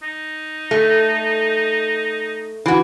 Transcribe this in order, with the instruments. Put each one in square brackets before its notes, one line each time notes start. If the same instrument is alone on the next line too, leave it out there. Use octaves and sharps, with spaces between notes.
[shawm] D#4
[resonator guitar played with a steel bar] A3
E3 F#4